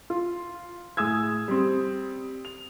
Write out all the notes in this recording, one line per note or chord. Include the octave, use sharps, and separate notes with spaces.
F4
A2 G#4 D#6 E6 G#6
G3 C4
F7